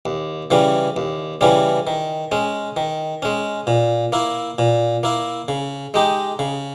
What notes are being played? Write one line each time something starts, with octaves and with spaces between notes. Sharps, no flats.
D#2
C#3 E3 G3 C#4
D#2
C#3 E3 G3 C#4
D#3
G#3 C#4
D#3
G#3 C#4
A#2
A#3 E4
A#2
A#3 E4
C#3
G#3 D#4 G4
C#3